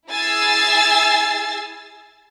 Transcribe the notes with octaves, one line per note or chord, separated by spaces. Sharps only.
E4 G#4 G#5 E6 A6 C7